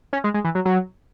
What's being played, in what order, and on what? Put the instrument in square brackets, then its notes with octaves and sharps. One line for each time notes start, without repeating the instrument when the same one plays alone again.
[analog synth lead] C#4
G#3
G#3
E3
F#3
F#3